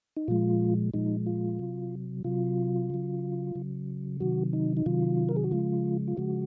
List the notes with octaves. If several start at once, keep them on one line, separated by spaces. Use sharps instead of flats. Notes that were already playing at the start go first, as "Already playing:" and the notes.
D#4
A#2 F3 G#3 F4
A#2 F3 G#3 D#4
F4
C3 F#3
C3 F#3 F4
C#3 F#3
C#3 F#3
C3 D#3 F#3 F#4
D#4
D#4
C3 D#3 F#3 F4
A#4
G#4
F#4
C#3 F3 G#3 F4
F4
C#3 F3 G#3 F#4